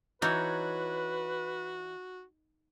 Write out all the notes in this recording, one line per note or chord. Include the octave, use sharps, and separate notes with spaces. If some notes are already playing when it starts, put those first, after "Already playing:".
E3 D#4 F#4 B4 C#5